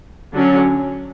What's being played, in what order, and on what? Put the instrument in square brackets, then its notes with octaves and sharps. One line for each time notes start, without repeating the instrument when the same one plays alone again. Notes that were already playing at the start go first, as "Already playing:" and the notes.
[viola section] D3 F#3 C#4